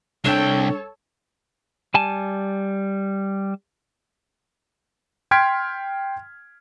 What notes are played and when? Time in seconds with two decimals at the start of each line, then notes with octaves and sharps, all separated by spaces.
0.24 C2 D4 A4 C#5 G5
1.94 G3 G#5 A5
5.31 G5 C6 F6 G#6 B6 D7